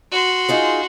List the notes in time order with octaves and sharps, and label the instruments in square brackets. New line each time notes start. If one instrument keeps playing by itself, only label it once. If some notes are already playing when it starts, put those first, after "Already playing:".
[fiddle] F#4 C6
[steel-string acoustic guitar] D#4 F4 G#4